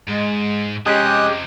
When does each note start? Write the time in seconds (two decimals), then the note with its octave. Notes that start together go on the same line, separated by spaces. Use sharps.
0.08 G#2 G#3
0.86 C3 F3 G#3 C#4 G4 D#5 D#6 F#6